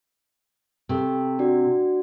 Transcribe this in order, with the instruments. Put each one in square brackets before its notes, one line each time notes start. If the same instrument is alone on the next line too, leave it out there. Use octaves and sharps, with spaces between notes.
[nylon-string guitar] C3 [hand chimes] G4 A4
[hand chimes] D4 F#4 D5